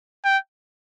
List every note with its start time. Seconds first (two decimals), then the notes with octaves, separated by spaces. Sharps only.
0.24 G5